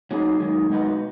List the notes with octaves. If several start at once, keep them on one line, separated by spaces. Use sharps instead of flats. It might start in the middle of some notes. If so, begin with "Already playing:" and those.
F#3 A#3 D#4 G#4
F#2 D#3 G#3
B2 G#3 D#4 F#4 B4